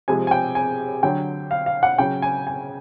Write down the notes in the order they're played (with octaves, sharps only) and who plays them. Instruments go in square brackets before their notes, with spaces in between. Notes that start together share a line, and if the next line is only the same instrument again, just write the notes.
[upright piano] C3 F3 G#3 G#5
G#5
G5
G#5
D3 F#3 G5
F5
F5
F#5
C#3 F#3 G5
G#5
G#5